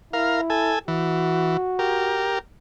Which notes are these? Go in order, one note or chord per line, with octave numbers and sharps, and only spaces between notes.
E4 A#4 F5
A4 G#5
E3 F#4
G4 A#4